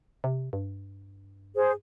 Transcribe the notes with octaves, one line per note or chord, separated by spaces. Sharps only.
C3
G2
G#4 C5